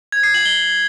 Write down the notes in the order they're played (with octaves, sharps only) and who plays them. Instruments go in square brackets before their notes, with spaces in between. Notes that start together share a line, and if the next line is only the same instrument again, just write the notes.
[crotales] G#6
C7
F#7
G7